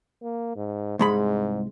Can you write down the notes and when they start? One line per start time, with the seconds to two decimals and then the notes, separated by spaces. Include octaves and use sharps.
0.22 A#3
0.56 G#2
0.99 C2 G#2 G#3 B5